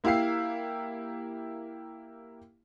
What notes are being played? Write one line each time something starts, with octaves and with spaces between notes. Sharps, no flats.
A#3 E4 G4 F5 E6 C7